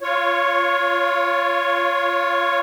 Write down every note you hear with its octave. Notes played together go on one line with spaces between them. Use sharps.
F4 C#5